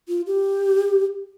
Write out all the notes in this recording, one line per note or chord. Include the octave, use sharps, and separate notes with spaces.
F4
G4